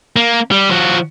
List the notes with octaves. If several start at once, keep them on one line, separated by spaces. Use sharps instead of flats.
A#3
G3
F3 F#4